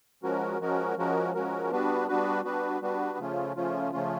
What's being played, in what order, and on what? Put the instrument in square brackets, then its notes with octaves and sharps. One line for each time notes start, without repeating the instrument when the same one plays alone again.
[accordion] F3 G#3 C#4 F#4 A#4
F3 G#3 C#4 F#4 A#4
F3 G#3 C#4 F#4 A#4
F3 G#3 C#4 F#4 A#4
G3 B3 D4 F#4 B4
G3 B3 D4 F#4 B4
G3 B3 D4 F#4 B4
G3 B3 D4 F#4 B4
C#3 F3 A3 C#4 F4
C#3 F3 A3 C#4 F4
C#3 F3 A3 C#4 F4